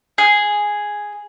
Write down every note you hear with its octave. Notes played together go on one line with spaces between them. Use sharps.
G#4